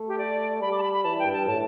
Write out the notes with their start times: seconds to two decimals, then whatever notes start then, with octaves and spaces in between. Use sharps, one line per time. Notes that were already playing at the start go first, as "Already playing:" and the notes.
Already playing: A3
0.08 G4
0.18 D5
0.61 G3 B5
0.72 D6
0.78 A5
0.82 B5
0.93 B5
1.04 E3 A5
1.19 G5
1.26 G2
1.33 A5
1.47 A2 A5